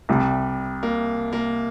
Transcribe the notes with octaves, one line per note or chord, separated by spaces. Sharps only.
C2 C3 G3
A#3
A#3